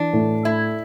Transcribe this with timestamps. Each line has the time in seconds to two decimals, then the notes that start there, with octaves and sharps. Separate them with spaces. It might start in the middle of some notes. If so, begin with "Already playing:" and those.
Already playing: E3 D4
0.13 A2
0.45 A3 E4